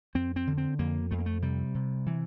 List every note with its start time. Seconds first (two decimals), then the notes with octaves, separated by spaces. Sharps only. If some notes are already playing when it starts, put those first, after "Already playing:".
0.15 F2 C4
0.36 C4
0.47 D3
0.58 C4
0.79 F2 A#3
1.11 F2 A3
1.18 A#3
1.26 A3
1.42 C3 G3
1.75 C3
2.06 C3 E3